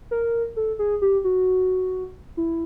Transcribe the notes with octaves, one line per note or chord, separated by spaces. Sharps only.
A#4
A4
G#4
G4
F#4
E4